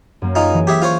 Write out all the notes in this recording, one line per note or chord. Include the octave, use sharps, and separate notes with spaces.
F#2 A#3
D#4 F4 G#4 G#5
E3
G4 G#4 E5
F4 C5 C#5